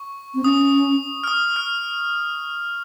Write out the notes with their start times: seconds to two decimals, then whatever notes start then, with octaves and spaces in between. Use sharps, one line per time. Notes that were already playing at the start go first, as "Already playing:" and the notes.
Already playing: C#6
0.35 C4
0.44 C#4 D#6
1.24 F6
1.27 D#6
1.56 F6